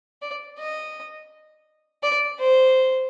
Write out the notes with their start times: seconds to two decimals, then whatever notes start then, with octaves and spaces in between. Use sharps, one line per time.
0.22 D5
0.58 D#5
2.03 D5
2.39 C5